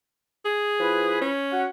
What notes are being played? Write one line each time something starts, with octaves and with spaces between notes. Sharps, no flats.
G#4
F3 E4 B4
C#4
F#4 F#5